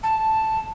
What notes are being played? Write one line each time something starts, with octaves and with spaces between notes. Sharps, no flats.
A5